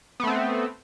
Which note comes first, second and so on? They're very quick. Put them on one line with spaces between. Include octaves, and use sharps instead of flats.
B3 A3 C4